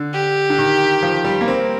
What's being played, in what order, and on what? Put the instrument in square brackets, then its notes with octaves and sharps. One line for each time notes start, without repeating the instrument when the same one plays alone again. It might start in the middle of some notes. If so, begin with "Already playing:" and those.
Already playing: [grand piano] D3
[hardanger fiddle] G4
[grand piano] D3
D#3
F3
G3
A#3
[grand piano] C4 [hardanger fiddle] A#4